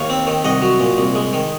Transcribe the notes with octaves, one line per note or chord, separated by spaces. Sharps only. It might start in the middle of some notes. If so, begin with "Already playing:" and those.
Already playing: D#2 C#5 F5
C4
D#3
C2 D#5 F#5
F#3
A#2
C2
G#3
D#3